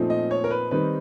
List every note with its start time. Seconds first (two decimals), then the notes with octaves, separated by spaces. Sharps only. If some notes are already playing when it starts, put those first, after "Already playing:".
Already playing: A#2 F3 A3 C4 D#4
0.10 D#5
0.31 C#5
0.44 A#4
0.51 B4
0.71 D#3 G3 C4 D#4 B4